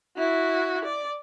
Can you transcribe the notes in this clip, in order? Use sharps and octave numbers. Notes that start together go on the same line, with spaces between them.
E4 F#4
D5